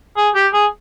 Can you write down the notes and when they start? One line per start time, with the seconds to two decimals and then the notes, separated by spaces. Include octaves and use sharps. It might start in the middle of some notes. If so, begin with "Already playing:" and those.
0.17 G#4
0.35 G4
0.53 G#4